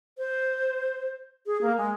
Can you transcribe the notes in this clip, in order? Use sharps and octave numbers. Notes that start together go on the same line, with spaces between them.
C5
G#4
A#3
G#3